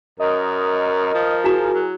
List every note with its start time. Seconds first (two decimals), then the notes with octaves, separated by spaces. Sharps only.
0.20 F#2 A#4 D#5
1.14 F3
1.44 E4 F#4 G#4 A#5
1.74 F#3